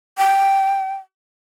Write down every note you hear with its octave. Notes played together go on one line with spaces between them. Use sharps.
G5